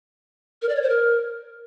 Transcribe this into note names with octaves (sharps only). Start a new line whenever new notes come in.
A#4
D5
C#5
C5
A#4